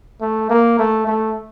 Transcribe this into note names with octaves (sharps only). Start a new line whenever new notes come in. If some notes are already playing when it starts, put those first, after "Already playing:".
A3
A#3
A3
A3